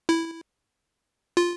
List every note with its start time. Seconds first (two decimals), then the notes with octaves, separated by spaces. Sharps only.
0.09 E4
1.37 F4